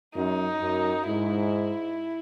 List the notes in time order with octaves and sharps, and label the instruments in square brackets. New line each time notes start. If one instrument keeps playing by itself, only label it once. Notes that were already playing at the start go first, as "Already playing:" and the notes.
[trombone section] F#2 [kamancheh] D#4
[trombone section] F#2
[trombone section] G#2 [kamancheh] E4